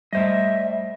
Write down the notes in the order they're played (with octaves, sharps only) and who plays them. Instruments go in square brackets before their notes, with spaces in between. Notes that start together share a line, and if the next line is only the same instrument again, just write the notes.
[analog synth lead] G3 [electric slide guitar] A3 C5 D#5 [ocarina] E5